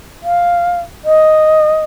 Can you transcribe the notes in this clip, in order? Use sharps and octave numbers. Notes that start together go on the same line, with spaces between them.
F5
D#5